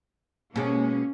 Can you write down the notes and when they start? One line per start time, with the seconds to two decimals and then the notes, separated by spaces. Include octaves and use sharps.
0.56 B2 G#3 A#3 C#4